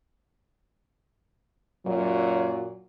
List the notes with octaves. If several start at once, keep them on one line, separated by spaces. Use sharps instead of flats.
F#2 A#2 F#3